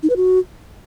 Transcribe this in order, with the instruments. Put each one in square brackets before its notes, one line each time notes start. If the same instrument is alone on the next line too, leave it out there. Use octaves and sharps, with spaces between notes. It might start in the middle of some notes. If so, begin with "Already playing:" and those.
[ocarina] D#4
B4
F#4